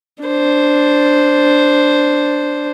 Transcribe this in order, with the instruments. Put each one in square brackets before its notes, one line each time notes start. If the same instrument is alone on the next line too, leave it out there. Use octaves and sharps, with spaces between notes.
[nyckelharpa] D4 C5